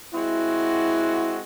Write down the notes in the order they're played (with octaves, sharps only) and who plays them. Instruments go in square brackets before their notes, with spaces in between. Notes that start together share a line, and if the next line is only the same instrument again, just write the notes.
[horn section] G#3 C4 F#4 [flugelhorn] E4